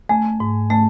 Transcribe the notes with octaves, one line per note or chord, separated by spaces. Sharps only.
A3 G#5
G#2
A3 A5